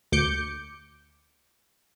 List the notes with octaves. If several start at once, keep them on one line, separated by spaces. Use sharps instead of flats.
D2 D6 G6 C#7